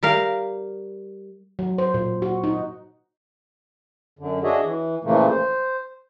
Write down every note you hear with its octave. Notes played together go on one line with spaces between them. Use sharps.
G3 A#4 F5
F#3
C5
A#2
F#4
D#4
F#2 D3
D4 F#4 G#4 C#5 D#5 E5
E3
A#2 C#3 E3 F3 A3 A#3
C5